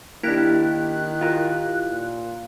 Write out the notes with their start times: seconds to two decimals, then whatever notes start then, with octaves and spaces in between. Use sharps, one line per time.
0.23 D#3 A#3 D4 E4 G4 F#6
1.21 F4 A#4
1.90 A#2